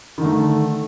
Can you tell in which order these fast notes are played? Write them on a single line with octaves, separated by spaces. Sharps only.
D#3 D3 A3